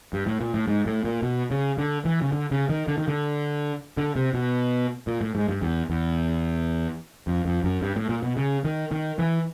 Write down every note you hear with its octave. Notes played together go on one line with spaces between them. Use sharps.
G2
A2
A#2
A2
G#2
A2
A#2
B2
C#3
D3
E3
C#3
D3
C#3
D#3
D3
D#3
D3
D3
C3
B2
A#2
A2
G#2
G2
E2
E2
F2
F2
F#2
G2
A2
A#2
B2
C#3
D#3
D#3
E3